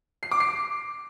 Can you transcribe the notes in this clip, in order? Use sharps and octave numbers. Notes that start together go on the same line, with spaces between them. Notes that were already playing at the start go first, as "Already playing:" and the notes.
C7
D6
C7